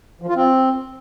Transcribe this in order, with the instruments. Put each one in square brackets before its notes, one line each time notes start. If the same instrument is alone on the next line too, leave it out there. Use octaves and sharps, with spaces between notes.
[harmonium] F3
F4
C4